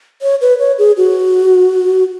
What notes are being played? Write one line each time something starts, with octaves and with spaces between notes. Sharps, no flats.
C#5
B4
C#5
G#4
F#4